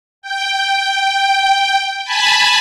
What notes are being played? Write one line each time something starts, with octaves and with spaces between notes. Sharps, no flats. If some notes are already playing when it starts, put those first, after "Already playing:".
G5
G#5 A5 B5